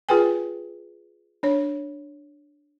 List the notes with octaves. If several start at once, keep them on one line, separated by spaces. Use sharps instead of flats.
F4 G#4 B4 G5 G#5
D4 C#5